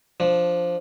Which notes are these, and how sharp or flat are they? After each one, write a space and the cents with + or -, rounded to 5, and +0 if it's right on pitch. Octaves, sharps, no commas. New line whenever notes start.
F3 +0 D4 +0